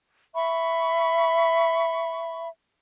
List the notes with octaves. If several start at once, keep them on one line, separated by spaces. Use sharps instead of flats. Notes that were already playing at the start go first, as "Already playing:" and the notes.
E5 B5 C#6